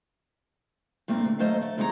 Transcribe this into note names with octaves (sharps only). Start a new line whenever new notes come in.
G2 A3 A#3 C4
D2
D#2 F#3 A3 C5 D#5 F5
A3
E2 G3 G#3 C#4 G#4 A#5